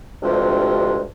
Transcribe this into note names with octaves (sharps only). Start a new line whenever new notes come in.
D2 G2 C3 F3 G#3